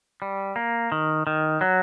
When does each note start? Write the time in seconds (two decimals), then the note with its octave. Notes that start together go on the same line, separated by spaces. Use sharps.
0.22 G3
0.56 A#3
0.92 D#3
1.27 D#3
1.61 F#3